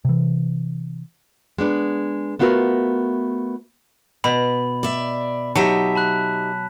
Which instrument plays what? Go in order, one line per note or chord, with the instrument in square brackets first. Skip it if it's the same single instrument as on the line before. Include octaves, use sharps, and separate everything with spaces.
[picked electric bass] C3 E3
[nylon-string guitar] G#3 B3 D4 B4
A3 B3 F4 F#4 A#4 B4
[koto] B2 [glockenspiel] B5
[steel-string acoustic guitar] D5 E5
[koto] F#3 [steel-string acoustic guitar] D#4 G4 E5 [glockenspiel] A5 B6
[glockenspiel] A5 B5 F#6